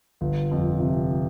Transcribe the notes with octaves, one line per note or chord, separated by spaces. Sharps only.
G1
F2
C3